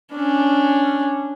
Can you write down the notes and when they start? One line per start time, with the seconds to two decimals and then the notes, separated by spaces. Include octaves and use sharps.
0.13 C#4 D4